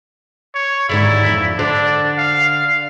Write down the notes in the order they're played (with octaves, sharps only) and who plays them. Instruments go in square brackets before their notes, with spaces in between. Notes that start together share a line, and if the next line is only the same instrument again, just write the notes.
[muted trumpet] C#5
[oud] D#2 G#2 D3 [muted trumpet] E4
[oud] F2
[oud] D3 C5 [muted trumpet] D4
[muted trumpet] F5